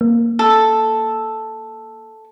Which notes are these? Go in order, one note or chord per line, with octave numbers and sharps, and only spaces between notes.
A#3
A4